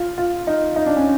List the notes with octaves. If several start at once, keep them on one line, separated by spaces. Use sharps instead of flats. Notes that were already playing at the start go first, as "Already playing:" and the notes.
Already playing: F4
F4
D#4
D#4
D4
C#4